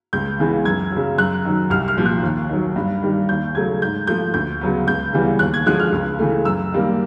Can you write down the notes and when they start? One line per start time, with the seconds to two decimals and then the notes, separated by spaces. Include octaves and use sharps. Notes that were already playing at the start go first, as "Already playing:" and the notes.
0.13 C#2 G6
0.39 C#3 E3 G#3 B3
0.65 F#2 G#6
0.92 C#3 F#3
1.18 F#2 F#6
1.45 D#3 F#3
1.70 C2 F6
1.88 F6
1.97 A#2 F3
2.06 F#6
2.23 D#2
2.49 D#3 F#3
2.76 G2
3.02 D#3 G3
3.29 D#2 G6
3.55 C#3 F#3 A3 G#6
3.82 G#2 G6
4.07 F3 A3 G6
4.34 D2 G6
4.61 C#3 F#3 B3
4.87 C#2 G6
5.13 C#3 E3 G3 B3
5.39 D#2 F#6
5.54 G#6
5.66 D3 F3 G#3 F#6
5.80 F6
5.92 C#2
6.19 C#3 E3 A3
6.45 F#2 E6
6.72 D#3 G3 A#3